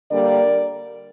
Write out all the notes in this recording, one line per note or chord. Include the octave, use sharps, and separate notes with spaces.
D3 G3 A#3 A#4 D5